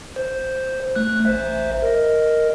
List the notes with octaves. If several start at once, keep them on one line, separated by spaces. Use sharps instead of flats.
C5
A3 F#6
A1 C5 E5
A#4 D#5